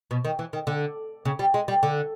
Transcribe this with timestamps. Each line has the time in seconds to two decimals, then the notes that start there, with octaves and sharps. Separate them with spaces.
0.11 B2
0.25 D#3
0.39 E3
0.53 D#3
0.67 D3
1.25 C#3
1.39 G3
1.54 G#3
1.68 G3
1.83 D3